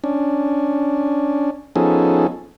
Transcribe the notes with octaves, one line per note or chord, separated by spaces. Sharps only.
C#4 D4
F3 B3 C#4 D#4 G#4 A4